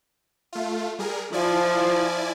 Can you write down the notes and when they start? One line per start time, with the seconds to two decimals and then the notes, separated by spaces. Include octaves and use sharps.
0.53 A3 F4
0.99 G3 G#4 A#4
1.33 F3 E4 D5 G#5